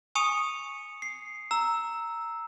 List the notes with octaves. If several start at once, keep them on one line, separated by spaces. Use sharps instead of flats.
G#5 C#6 D#6 C#7 D#7 F7
C7
A#5 E6